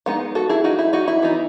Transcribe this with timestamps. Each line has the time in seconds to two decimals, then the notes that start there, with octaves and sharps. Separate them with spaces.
0.06 G#3 B3 D#4 F#5
0.35 F#4 A4
0.49 E4 G#4
0.64 D#4 F#4
0.79 E4
0.93 D#4 F#4
1.08 E4
1.22 E3 B3 D#4